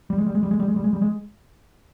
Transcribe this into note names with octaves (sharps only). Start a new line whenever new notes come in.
G3
G#3
G3
G#3
G3
G#3
G3
G#3
G3
G#3
G3
G#3